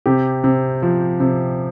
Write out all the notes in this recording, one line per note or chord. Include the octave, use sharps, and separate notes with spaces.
C3 G4
C3
F3
C3